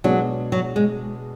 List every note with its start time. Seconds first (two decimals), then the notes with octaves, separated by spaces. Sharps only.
0.04 B2 F#3 G#3 D4 G#4
0.52 F#3
0.76 G#3